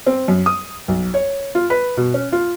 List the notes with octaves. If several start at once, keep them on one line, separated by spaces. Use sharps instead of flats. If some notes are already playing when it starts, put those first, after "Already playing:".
C4
F#2
D#6
B1
C#5
F4
B4
B2
C#4
F4